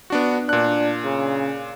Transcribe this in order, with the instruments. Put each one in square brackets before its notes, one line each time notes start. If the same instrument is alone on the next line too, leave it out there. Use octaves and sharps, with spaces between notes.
[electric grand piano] B3 D4 F#4
[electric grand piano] A#2 F#6 [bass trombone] D4
[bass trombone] C#3